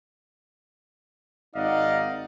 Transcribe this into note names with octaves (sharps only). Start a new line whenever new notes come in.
G#1 D#4 D5 D#5 F5 F#5